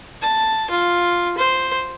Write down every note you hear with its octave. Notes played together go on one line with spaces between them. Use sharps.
A5
F4
C5